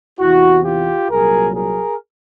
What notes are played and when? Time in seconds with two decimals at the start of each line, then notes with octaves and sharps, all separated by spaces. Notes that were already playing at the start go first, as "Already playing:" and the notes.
0.19 E2 C3 E3 E4 F#4
0.64 F4 G4
1.10 C2 A#2 F#3 G#4 A#4
1.55 G#4 A#4